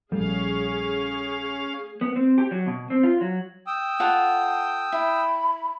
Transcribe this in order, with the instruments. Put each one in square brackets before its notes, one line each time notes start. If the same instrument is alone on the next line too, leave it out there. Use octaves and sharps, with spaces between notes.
[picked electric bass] A#1 G3 [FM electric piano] A3 [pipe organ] C#4 F5 [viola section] G#4
[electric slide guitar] B3
C4
G4
F#3
B2
C4
F4
F#3
[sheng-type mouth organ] G5 D#6 E6
[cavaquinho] F4 A4 F#5
[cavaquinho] E4 [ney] B5